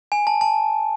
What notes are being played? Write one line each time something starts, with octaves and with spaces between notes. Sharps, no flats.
G#5
A5
A5